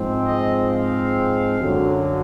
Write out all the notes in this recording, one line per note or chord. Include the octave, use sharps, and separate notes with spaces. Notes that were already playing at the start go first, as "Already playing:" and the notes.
Already playing: G#2 F3 G#3 C4
D#5
F5
F#2 D3 F#3